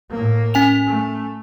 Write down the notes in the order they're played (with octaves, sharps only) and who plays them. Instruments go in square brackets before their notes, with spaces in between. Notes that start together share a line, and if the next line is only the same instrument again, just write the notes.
[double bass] A2 A#3
[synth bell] C#4 G#5 F7
[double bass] A3